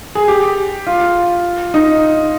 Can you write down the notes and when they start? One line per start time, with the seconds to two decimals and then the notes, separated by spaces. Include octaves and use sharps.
0.15 G#4
0.28 G4
0.86 F4
1.74 D#4